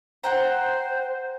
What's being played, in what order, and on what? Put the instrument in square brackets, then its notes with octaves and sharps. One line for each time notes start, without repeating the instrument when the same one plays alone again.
[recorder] C5 [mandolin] F#5 G5 A#5